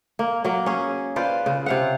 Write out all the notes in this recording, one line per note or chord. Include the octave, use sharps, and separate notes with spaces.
A#3
F#3 A#3
C#4 G#4
F4 B4 C5 D5
C#3
C3 F5 F#5